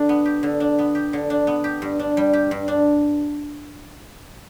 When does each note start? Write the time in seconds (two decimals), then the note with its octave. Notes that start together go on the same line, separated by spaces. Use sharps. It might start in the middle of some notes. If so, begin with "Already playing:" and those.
Already playing: D3 D4
0.09 B3
0.26 G4
0.43 D3
0.60 D4
0.79 B3
0.95 G4
1.13 D3
1.30 D4
1.47 B3
1.64 G4
1.82 G2
1.99 D4
2.17 G3
2.33 G4
2.51 G2
2.68 D4